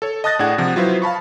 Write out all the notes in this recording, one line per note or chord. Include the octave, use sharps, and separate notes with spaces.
A4 C#5
D#5 A5 D#6 F#6 A6 A#6
A2 D4 G#4 F#5 G#6
C3 F3 F#5
F#3 E4 F4 B4 C5
F5 A5 B5 C#6